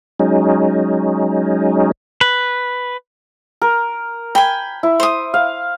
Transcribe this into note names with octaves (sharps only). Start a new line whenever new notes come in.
F#3 G#3 C#4 D#4
B4
A#4
G5 G#5 B5
E4
C5 D#6
F5